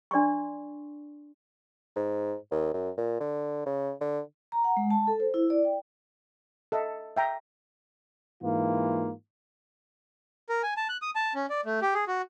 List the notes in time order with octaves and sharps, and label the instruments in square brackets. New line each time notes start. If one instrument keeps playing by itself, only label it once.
[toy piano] D4 D5 C6 C#6
[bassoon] G#2
D#2
F#2
A#2
D3
C#3
D3
[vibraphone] A#5
F#5
G#3
A5
A4
C5
E4
D5
G5
[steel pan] A4 D#5 E5
E5 G5 A#5
[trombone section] G#2 E3 A#3 F4
[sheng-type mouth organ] A#4
G#5
A5
F#6
D#6
A5
C#4
D5
A3
G4
G#4
F#4